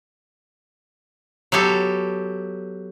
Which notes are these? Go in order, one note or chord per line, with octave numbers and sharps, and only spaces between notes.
F#3 B3 G4 A4